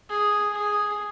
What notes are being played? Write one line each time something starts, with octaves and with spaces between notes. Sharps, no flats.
G#4
G#4